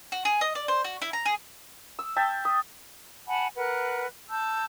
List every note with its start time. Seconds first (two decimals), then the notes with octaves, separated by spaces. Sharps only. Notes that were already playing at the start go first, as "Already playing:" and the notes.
0.12 F#4
0.25 G#4
0.41 D#5
0.55 D5
0.68 C5
0.84 F#4
1.02 E4
1.13 A#5
1.25 G#4
1.99 E6
2.16 E5 G5 A5
2.45 D#6
3.26 F#5 G#5 A5 B5
3.57 A#4 B4 F#5 F#6
4.30 A5 E6 G6